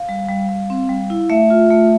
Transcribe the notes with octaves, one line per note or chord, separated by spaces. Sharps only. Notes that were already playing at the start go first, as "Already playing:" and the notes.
Already playing: F5
G3
G3
G3
C4
G3
E4
A3 E5
F4
A3